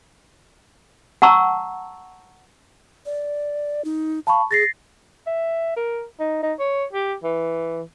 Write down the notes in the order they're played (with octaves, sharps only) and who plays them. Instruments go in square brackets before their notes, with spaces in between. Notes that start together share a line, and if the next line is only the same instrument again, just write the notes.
[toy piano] F#5 A5 A#5 C#6 E6
[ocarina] D5
D#4
[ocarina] F5 [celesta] A5 B5 C#6
[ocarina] G#4 [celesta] A6 A#6 C7
[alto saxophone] E5
A#4
D#4
D#4
C#5
G4
E3